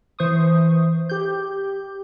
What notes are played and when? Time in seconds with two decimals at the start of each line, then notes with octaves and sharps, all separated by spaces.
0.19 E3 C5 C#6 D#6
1.09 G4 G6